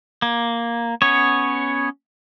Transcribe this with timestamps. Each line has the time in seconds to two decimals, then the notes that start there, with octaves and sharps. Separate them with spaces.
0.22 A#3
1.02 B3 C#4 C#5